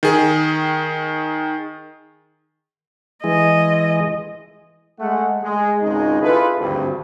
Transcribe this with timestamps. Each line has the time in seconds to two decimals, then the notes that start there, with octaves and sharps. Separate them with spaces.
0.03 D#3 G#4
3.24 E3 G#3 D#5
5.00 G#3 A3 F#5
5.43 G#3
5.82 G#1 C#2 C#3 G#3 D#4
6.22 E4 F4 G#4 A4 B4
6.59 G#1 D2 G2 C4